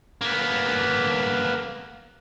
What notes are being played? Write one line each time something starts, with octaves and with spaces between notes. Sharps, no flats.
A#3 B3